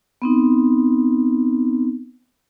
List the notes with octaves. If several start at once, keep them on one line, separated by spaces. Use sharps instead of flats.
B3 C4 D#4